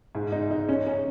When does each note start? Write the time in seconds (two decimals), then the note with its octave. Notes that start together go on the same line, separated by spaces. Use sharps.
0.15 G#2
0.32 D#4
0.51 D#4
0.69 C#4
0.87 C#4